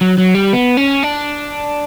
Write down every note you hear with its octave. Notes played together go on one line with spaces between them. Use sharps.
F#3
F#3
G3
B3
C#4
D4